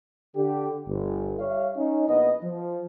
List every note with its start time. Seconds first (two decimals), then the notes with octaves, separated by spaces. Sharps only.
0.35 D3 G4
0.86 G1
1.38 G3 C#5 E5 F5
1.76 C#4 D#4
2.07 A#1 B3 E4 D#5
2.43 F3